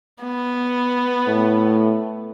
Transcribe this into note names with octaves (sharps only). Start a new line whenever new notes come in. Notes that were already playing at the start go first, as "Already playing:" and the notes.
B3
A2